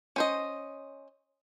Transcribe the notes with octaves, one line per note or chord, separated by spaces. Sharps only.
C#4 C5 D#5